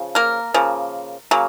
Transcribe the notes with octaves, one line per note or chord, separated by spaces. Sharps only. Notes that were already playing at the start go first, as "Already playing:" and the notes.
Already playing: C#3 F3
A#3 A#4
C#3 F3 A#3
C#3 F#3 A#3